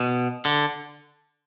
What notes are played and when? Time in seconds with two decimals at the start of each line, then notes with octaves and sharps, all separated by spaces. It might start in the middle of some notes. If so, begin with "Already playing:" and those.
Already playing: B2
0.45 D3